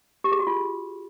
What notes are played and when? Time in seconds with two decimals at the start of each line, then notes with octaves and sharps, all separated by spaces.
0.24 G4
0.32 G#4
0.39 F#4
0.47 F4